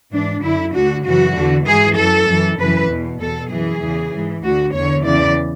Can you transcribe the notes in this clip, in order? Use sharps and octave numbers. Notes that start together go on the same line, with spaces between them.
G#2 E3 D4
F#2 D3 E4
D2 D3 F#4
F#2 C#3 E3 F#4
E2 D3
G#2 E3 G#4
F#2 E3 A4
F#2 E3
F#2 C#3 E3 B4
E2 B2
E2 B2 A4
F#2 E3 G#4
E2 C#3 E3
G#2 E3
D2 D3 F#4
E2 D3 C#5
E2 C#3 E3 D5